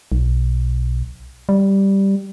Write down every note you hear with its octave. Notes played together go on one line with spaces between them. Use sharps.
B1
G3